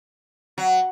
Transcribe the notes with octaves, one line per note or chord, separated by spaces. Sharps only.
F#3